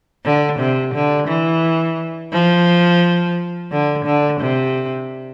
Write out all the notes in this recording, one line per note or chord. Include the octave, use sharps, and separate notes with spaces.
D3
C3
D3
E3
F3
D3
D3
C3